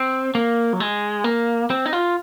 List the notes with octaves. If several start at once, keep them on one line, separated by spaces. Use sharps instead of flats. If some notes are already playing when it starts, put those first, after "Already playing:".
Already playing: C4
A#3
F#3
G#3
A#3
C4
D#4
F4